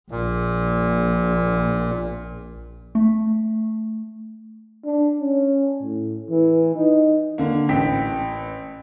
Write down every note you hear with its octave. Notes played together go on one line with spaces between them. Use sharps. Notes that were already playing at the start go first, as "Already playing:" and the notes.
A#1 A#2
A3
D4
C#4
A2
E3
D#4
D3 A#3
A1 G5 B6